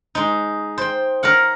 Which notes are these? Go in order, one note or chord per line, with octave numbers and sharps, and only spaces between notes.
G#3 D#4
C5 G5
A#4 C#5 F5 F#5